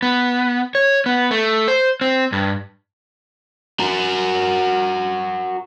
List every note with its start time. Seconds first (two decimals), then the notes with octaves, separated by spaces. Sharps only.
0.03 B3
0.75 C#5
1.06 B3
1.31 A3
1.68 C5
2.01 C4
2.32 G2
3.80 F#4 A#4